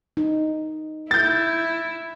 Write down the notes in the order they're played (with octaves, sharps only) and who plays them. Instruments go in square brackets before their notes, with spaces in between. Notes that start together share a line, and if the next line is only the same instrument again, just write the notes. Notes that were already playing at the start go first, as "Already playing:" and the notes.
[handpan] D#4
[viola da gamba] E4 [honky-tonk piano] G6 A6